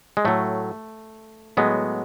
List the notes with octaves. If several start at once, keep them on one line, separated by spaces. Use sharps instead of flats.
G#3
A2 F#3 A3
A2 F#3 G#3 B3